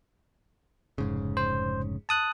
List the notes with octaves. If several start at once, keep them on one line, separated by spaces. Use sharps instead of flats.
F1 G#2 C#3
C5
A5 D#6 F#6